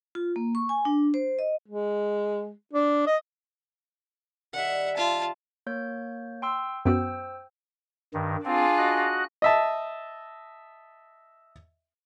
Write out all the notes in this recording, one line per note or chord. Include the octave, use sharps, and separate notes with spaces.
F4
A#3
C#6
G#5
D4
C5
D#5
G#3
D4
D#5
D#3 G3 E5 F#5
F4 A5
A#3 C#5 G6
G5 C6 E6
F#2 B3 F#4 C5 G5 E6
G2 D#3
C4 D4 F4 G#4
F#4 D#5 F#6
D#5 E5 A5